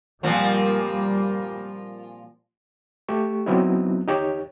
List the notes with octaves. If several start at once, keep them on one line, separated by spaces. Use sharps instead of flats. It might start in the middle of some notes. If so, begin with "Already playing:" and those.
A#2 F3 G3 A#3 C4
A3 G4 C#6
F#3 B3 C4 D#4 E4
D#4 G4 C#5